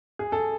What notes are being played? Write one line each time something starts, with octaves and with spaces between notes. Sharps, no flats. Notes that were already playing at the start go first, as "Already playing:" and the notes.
G#4
A4